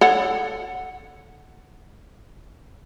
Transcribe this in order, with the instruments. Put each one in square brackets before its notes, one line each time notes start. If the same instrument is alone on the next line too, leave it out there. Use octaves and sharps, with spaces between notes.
[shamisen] A4 C#5 F#5